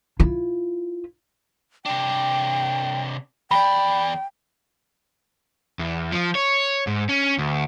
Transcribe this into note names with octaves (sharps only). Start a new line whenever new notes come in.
E4 F4
C3 D4 G5
E2 D5 G5 B5
E2
F3
C#5
G#2
C#4
D2